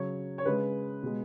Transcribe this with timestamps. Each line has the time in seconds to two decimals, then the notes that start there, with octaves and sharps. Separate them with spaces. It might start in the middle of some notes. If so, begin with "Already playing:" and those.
Already playing: C#3 F#3 C#5
0.38 C#5
0.45 C#3 G#3 B4
1.03 B2 G#3